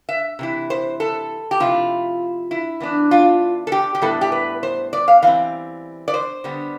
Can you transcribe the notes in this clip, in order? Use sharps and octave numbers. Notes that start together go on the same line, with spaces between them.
E5
C3 E3 E4
C5
A4
G4
C3 F3 A3 E4 F4
E4
E3 B3 D4
F4
A4
G4
G4
A2 G3 B3 E4 A4
G4
B4
C5
D5
F5
E3 G3 C4 F5
D5
C5
D3 G3 B3